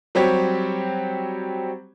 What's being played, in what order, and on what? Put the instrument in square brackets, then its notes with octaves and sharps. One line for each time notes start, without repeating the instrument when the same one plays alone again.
[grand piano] F#3 G3 C4 G4 C#5